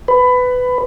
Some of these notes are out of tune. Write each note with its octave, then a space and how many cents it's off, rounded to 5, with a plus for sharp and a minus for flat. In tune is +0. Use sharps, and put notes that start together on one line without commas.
B4 +20